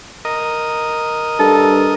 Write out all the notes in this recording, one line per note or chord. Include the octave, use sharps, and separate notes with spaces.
A#4 D#5
G2 A4